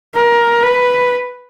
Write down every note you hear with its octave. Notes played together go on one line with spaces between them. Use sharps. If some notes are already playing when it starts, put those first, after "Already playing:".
A#4
B4